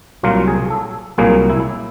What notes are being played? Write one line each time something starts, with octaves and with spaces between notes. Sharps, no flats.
C2 A#2 F#3 A#3 F4
G#4
A4
C2 A#2 F#3 A#3 G#4
E4